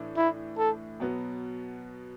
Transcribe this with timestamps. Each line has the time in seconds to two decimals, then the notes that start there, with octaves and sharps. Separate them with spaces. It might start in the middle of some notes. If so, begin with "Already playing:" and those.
Already playing: A2 E3 D4
0.17 E4
0.58 A4
1.00 B2 F#3 B3